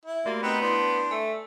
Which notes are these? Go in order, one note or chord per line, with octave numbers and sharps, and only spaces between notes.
E4
A3 A#3 F#4 G4
B3 C4 D#4 B4
D4 E4 C5
A3 G#5